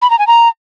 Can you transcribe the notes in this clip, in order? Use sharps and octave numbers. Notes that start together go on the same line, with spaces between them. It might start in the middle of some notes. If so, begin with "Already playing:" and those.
B5
A#5
G#5
A#5